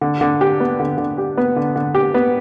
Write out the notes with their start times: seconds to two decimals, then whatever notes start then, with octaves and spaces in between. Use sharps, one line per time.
0.01 D3
0.21 D3
0.41 G4
0.60 B3
0.80 D3
0.98 D3
1.18 G4
1.37 B3
1.56 D3
1.76 D3
1.95 G4
2.14 B3